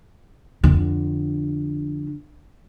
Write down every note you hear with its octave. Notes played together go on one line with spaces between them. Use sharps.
F2 D3